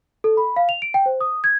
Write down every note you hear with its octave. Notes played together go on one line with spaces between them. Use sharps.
A4
B5
F5
F7
D7
G5
C5
D#6
G#6